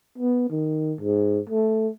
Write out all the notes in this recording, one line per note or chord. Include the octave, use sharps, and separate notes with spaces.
B3
D#3
G#2
A3